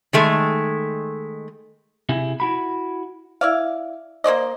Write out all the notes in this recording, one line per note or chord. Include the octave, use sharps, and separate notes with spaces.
D#3 G#3 A3
C3 E4 G#4
E4 F#4 B5
E4 D5 F5
A#3 C5 D5 D#5